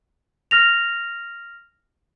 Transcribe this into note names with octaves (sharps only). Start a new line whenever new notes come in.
F6 A#6 F7